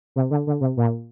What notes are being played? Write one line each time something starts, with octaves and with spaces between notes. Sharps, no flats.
C3
D3
D3
C3
A#2